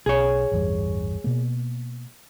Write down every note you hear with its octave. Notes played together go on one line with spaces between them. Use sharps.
B1 G#4 C#5
A1 E2 G2
B2 A#3